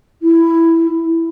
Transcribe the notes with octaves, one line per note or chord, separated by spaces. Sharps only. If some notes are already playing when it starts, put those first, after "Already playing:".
E4